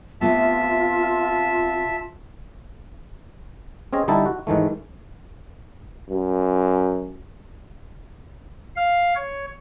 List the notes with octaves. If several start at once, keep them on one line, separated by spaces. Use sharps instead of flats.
C3 A3 B3 F4 E5 A5
C4 C#4 G#4 D#5
D3 G3 D#4 E4 A4
F#4
G#2 D#3 E3 A3
F#2
F5
C#5